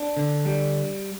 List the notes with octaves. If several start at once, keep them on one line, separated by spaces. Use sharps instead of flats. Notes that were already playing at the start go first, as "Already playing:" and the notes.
Already playing: D4
D3
G3